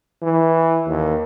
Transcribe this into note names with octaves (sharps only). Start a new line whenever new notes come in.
E3
D#2